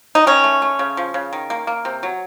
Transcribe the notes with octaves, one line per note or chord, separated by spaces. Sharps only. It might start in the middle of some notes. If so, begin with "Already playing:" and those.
D#4
D#3 C#4
A3
A3
C#3
F3
C#3
D#3
A#3
A#3
C3
F#3